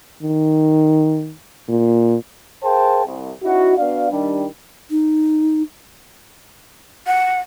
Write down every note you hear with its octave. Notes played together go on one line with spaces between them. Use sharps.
D#3
A#2
G#4 A#4 C5 F5 G5 A5
C2
C#4 D#4 E4 F#4
B3 D4 F#4 D5 F5
D#3 G3 D4
D#4
F#5